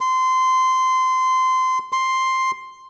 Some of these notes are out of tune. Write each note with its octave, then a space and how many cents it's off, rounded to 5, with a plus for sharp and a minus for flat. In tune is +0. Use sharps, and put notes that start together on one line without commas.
C6 -20
C6 +5